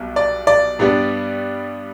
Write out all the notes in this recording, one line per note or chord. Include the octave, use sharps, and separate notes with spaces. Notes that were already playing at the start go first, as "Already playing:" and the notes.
Already playing: B1 B2 G3
D5
D5
G2 G3 B3 D4